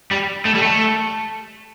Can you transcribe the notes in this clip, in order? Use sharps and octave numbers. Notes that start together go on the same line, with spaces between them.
G3
A3
G3
A3